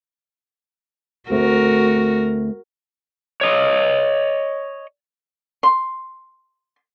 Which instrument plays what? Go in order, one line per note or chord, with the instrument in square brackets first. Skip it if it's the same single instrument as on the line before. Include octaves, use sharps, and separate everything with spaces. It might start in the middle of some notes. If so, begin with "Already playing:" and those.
[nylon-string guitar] D2 A3 C4 [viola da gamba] F#4 A#4
[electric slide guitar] C#5 D#5
[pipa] C6